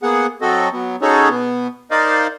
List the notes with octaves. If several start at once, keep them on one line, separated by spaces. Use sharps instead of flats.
A#3 B3 G#4 F#5
F#3 C4 F#4 A4 D#5
F#3 B3
C#4 D#4 F#4 G#4 A4 C#5
B2 B3
D#4 A#4 C5 D5 D#5 F5